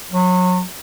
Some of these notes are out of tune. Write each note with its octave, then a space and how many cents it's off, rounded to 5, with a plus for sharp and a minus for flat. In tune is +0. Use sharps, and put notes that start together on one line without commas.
F#3 -30